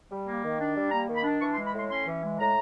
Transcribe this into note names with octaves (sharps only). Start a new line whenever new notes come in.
G3
A#3
D#3
D4
G3
A#3 A#5
D#3
B5
D4
E3 C#6
C6
G#3
B5
A2 C6
C#4 C6
E3
G#3
A2 A#5